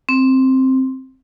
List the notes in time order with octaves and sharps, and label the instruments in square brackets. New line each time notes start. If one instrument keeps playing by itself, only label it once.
[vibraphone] C4